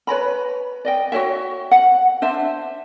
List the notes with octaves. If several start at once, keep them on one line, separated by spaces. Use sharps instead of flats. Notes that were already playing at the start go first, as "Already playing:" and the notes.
B4 C#5 A#5 B5
D5 D#5 G5
F#4 G#4 C#5 E5
F#5
D4 C5 E5